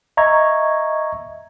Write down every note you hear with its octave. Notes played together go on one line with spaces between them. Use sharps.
D#5 E5 A#5 C#6 G#6